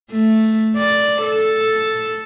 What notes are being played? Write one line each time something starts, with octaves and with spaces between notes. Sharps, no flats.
A3
D5
A4